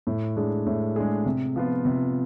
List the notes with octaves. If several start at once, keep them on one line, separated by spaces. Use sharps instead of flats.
A2
G#3 D4 G#4
A2
G#3 D4 G#4
C3
F3 B3 F4
C3